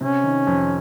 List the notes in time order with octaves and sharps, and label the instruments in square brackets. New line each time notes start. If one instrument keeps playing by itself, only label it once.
[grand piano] C3 [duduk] C#4
[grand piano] D#3
F2